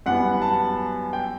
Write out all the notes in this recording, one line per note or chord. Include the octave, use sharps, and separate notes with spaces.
F#2 E3 G3 B3 F#5
A5
G5